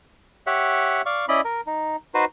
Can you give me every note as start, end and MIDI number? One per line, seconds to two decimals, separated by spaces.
0.47 1.02 67
0.47 1.02 73
0.47 1.02 76
0.47 1.02 78
1.06 1.25 74
1.06 1.25 77
1.06 1.25 85
1.28 1.41 61
1.28 1.41 64
1.28 1.41 74
1.28 1.41 75
1.28 1.41 83
1.45 1.61 70
1.67 1.96 63
2.14 2.25 63
2.14 2.25 66
2.14 2.25 71
2.14 2.25 72